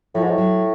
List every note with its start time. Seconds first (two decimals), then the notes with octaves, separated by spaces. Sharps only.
0.14 A2 F3
0.22 G#2
0.30 A2
0.38 F#3